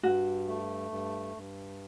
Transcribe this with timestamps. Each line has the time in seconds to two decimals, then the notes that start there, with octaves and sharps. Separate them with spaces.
0.03 G2 F#4
0.48 A3
0.91 G2
1.36 G2